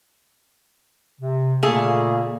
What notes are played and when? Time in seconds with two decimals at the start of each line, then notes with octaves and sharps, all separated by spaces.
1.21 C3
1.63 A#2 C#3 A3 A#3 G#4